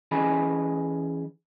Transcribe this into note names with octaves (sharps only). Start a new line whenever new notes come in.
E3 C#4 G#4 D#5 G#5 B5